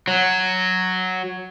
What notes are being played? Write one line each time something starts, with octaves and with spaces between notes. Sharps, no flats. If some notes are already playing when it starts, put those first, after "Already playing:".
F#3